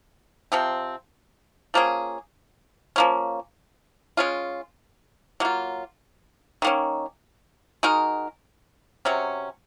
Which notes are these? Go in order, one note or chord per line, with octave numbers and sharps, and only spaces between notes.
C3 F3 C4
F3 A#3 C#4 G#4
F3 A#3 C#4
G#3 C#4 F4
F#3 A#3 F4
D#3 A#3 C#4
G#3 D#4 F#4 A#4
C3 F#3 C#4